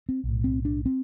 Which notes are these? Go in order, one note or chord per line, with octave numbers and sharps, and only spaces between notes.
C4
B1
A2
C4
D4
C4